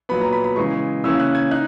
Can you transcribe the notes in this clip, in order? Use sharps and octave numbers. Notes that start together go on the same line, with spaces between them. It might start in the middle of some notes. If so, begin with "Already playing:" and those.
A#2 F#3 B3 B5
A#5
B5
B5
C#3 E3 G#3 C#6
C#3 E3 A#3 C#4 E4 E6
F#6
G#6
D#4 F#6